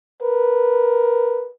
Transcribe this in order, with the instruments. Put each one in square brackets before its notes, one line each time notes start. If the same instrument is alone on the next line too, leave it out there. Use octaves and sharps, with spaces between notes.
[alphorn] A#4 [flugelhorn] B4